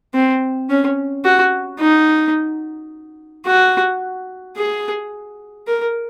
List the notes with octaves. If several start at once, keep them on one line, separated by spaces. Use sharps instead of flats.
C4
C#4
F#4
D#4
F#4
G#4
A#4